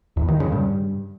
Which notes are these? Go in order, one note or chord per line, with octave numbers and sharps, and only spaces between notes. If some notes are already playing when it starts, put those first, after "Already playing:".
E2
D#3
C#3
G2